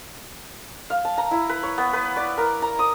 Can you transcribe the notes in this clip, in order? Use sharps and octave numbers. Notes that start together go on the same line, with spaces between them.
F5
A5
A#5
E4
B4
C#5
B3
B4
D5
A#4
A#5
D#6